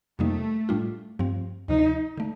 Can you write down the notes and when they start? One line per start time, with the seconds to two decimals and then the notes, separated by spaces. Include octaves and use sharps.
0.19 F2 C3 G3 A3 A#3 D#4
0.69 A2 G3 D4 F4
1.19 G2 F3 C4
1.68 D2 C3 F3 D#4
2.17 D3 A3